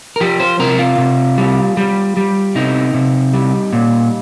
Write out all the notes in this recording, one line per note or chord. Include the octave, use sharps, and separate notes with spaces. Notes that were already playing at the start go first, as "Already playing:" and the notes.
A#4
F3 G4
C5
C3 A#4
F4
C3
G3
G3
G3
C3 D#4
C3
G3
A#2